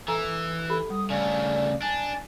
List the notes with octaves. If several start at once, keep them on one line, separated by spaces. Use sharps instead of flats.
E3 A4 G#5 A#5
G4 A4 B5
G3 D#6
D2 C#3 D5
D4 G#5